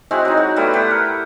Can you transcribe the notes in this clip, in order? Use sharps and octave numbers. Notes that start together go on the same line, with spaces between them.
G#3 C4 E4 F#4
F#3 D#4
F#4
G3 A3 B3 E4
G4 B4 F#5 C6
A#4